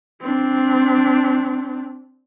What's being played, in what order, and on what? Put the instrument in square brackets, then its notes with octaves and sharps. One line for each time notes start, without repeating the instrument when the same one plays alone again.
[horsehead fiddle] C4 D4